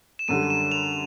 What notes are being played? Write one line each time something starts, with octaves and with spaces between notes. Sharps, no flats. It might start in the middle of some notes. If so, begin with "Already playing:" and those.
E7
F#2 D3 G3 D#7
E7
F7